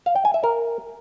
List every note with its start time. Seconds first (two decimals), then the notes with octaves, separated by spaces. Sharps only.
0.06 F5
0.16 G5
0.25 G#5
0.34 E5
0.44 A#4